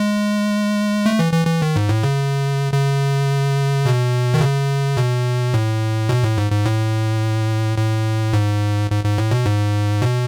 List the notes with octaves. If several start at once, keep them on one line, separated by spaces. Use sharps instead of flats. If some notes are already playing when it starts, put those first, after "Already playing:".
Already playing: G#3
A3
E3
E3
E3
D#3
G#2
A2
C#3
C#3
B2
D#3
C#3
B2
A2
B2
A2
G#2
G#2
A2
A2
G#2
G#2
G#2
A2
B2
G#2
B2